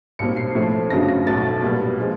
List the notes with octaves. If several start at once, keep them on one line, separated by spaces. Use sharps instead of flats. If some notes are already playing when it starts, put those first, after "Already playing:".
B1 A#2 G3 C4 C#7
C7
A2 F3 A3
G1 F#2 C#3 F#3 A#6
A#6
B1 B2 F#3 A3 A6
A#2 G3 B3
F3 G#3